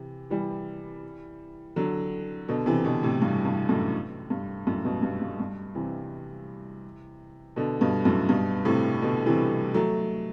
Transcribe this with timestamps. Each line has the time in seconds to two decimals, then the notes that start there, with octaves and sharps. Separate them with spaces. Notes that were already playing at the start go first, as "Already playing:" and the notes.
Already playing: C3 E3
0.30 E3 G3
1.76 D3 F#3
2.49 B2 D3
2.66 C3 E3
2.84 B2 D3
3.03 A2 C3
3.22 G2
3.45 G2
3.69 F#2 A2
4.30 G2
4.67 F#2 A2
4.85 G2 B2
5.02 G2
5.21 G2
5.40 G2
5.75 C3 E3
7.56 B2 D3
7.81 G2 B2
8.05 F#2 A2
8.29 G2 B2
8.65 A2 C3
9.02 B2 D3
9.26 C3 E3
9.74 F#3 A3